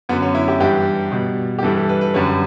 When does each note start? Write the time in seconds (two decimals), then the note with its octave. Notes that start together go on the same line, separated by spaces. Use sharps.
0.09 F#2 D3 F#3 B3
0.22 C#4
0.35 E4
0.48 G4
0.60 G2 E3 G3 G4
1.12 B2 G3
1.59 G4
1.63 G2 E3 G3 A4
1.76 A4
1.89 B4
2.01 B4
2.14 F#2 D3 G3 C#5